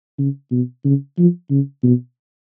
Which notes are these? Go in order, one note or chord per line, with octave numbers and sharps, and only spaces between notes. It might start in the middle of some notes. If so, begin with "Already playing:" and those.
C#3
B2
C#3
F3
C#3
B2